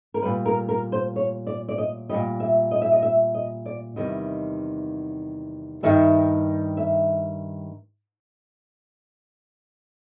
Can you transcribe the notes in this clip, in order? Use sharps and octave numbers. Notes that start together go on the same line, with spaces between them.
A#4
A#2 G3 B4
A#4
A#4
C5
C#5
D5
D5
D#5
A#2 G3 D#5
E5
D#5
E5
D#5
E5
D#5
D5
E2 C3 D#3 G3 D#5
G2 D#3 G3 E5
E5